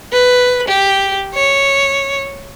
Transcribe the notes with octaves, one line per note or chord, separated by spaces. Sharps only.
B4
G4
C#5